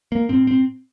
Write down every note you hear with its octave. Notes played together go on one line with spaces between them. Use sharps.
A#3
A2 C4
C4